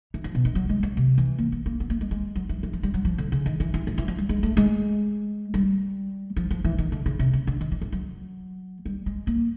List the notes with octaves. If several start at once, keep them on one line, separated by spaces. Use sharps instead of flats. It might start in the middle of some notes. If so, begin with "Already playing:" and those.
E3
F3
B2
D#3
F#3
G#3
F#3
C3
E3
A#3
A#3
A#3
B3
A#3
G#3
G#3
F#3
E3
E3
F3
G3
F#3
F3
D3
C#3
D#3
E3
E3
F3
E3
F3
G3
G#3
A3
G#3
G3
F3
F3
E3
D#3
D3
C#3
C3
C#3
D3
D#3
E3
F3
F#3
G3
G#3
A#3